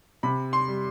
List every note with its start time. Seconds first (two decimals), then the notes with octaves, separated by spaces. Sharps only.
0.23 C3 B5
0.53 C6
0.68 G3